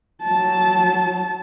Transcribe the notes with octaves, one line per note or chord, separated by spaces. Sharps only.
F#3 A5